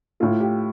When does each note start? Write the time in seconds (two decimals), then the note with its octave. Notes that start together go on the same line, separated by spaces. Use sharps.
0.20 A2 A3 F4
0.40 G4